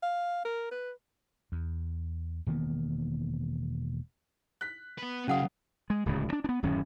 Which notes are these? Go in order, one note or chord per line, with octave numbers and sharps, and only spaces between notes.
F5
A#4
B4
E2
E1 D#3 A#3 B3
F#6 B6
B3 B4
C#3 F#3 C#4 G#4 F5 F#5 D#6
G#3
D1 C#2 C#3
D#3 D4
B3 D4
D1 F#2 D#3 C#4